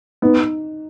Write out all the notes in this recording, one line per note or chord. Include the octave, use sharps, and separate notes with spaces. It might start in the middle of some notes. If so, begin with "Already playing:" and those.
B3 D#4